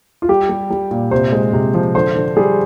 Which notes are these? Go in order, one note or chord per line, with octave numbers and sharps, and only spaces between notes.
F4
G3 G4
G3
G3
A#2
C3 C5
G#3
C3
F3
D3 C5
D3
G3 G#4